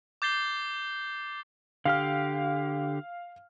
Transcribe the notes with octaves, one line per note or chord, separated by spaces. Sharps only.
D6 G6 A6 C7 G7
D3 G4 F5 F6